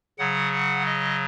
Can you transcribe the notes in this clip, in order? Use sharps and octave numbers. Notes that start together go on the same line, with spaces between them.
C#3 F#3 F#5
F#5
D#5